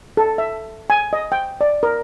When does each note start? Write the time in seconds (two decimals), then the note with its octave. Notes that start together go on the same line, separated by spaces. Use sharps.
0.17 A4
0.38 E5
0.90 G#5
1.13 D#5
1.32 G5
1.61 D5
1.83 A#4